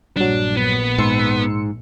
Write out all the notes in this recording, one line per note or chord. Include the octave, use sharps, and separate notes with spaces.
A#1 G2 F#3 D4
B3
G#2 C6 E6 C#7